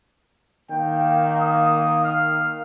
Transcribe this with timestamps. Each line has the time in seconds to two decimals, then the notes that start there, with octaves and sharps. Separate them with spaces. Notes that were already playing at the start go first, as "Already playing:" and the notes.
0.70 D#3 A#3 G5
1.41 D#6
2.04 F5